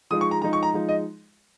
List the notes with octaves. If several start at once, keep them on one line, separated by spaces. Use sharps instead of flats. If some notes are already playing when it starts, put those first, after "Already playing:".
F3 G#3 D#4 D#6
C#6
A#5
F3 G#3 D#4 A#5
C#6
A#5
F3 G#3 D#4
D#5